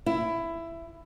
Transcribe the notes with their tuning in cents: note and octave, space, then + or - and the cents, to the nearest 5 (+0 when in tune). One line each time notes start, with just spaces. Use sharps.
E4 +15